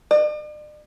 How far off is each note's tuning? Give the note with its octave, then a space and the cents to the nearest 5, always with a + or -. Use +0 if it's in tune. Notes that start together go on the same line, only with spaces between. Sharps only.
D5 +45